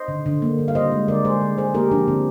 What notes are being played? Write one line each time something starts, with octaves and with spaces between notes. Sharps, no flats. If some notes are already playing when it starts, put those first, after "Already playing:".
Already playing: C5 D#5
D3
D3
A#3
G3
F5
D3 C5 D#5
G#3
D3 A#4 D5
G#3 G#4 C5
D3
G#3 G#4 C5
A#3 G4 A#4
F3 A#3 D4
D3 C4